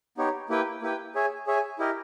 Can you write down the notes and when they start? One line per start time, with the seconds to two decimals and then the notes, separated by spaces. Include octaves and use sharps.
0.18 B3 D#4 G4 C#5
0.49 A#3 E4 G4 B4 G5
0.82 A#3 E4 G4 B4 G5
1.15 G#4 C#5 E5 G#5
1.47 G#4 C#5 E5 G#5
1.79 E4 G4 A#4 D#5